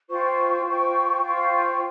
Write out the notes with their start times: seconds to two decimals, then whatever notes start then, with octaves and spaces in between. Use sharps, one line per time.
0.09 F4 C5 G5 C#6
0.65 F4 C5 G5 C#6
1.21 F4 C5 G5 C#6